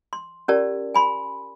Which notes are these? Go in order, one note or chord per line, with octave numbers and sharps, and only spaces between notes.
C6
C#4 F4 G4 A#4 D5 A5
G#5 B5 C6